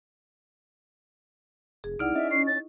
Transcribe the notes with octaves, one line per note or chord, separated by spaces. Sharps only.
F1 G#4
C2 D#4 E4 D5 F#5 F6 D7
C#4 D#5 E5
C#6 C7
A6